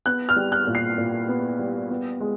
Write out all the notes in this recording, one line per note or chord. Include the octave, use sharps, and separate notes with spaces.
B3 F#6
F6
G3
F#6
A#2
C7
A#2
B3
G3
B3
G#3